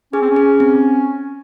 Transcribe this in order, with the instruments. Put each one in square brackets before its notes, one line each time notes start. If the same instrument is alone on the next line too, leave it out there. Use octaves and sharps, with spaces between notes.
[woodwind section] C#4 [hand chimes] G#4
[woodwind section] C4
C#4
[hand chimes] G#4
C4